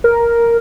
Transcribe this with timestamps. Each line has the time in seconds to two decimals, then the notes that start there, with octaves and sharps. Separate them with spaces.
0.04 A#4